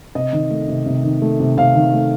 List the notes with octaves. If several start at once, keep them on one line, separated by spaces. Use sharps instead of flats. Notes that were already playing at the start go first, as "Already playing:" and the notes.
C3 D#5
D#3
A3
C3
C3
D#3
A3
C3
C3 F5
D#3
A3